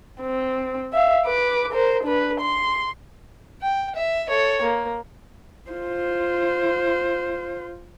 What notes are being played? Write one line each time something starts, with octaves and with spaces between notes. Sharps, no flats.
C4
E5 F5
B4 D6
A#4 C5
D4 B4
C6
G5
E5
A4 C#5
A#3
F4 C5